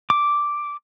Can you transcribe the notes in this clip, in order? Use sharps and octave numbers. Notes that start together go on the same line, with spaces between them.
D6